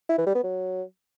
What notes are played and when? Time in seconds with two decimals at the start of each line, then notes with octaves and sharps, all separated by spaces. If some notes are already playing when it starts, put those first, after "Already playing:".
0.09 E4
0.18 E3
0.26 G3
0.35 B3
0.43 F#3